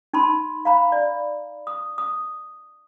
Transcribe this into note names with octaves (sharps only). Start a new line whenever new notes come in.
D#4 A5 B5 C6
F5 A#5 B5
D5
D#6
D#6